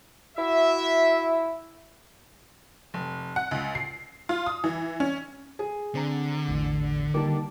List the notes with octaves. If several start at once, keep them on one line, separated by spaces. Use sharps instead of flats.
E4 F#4 E5
F1
F#5
C#2
C7
F4
D#6
E3
C#4
G#4
D3 C4 A#5
A1 E2
D#3 G3 A#3 A5 D6